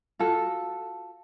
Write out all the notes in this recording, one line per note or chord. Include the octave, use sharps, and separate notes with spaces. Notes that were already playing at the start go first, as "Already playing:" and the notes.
F4 F#4 A4